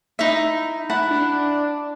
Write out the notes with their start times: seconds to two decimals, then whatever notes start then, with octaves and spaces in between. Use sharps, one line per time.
0.19 D#4 E4 E5
0.90 E4 F#5 A5
1.11 D4